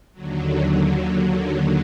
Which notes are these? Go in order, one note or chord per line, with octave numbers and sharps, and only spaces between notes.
D#2 D3 F#3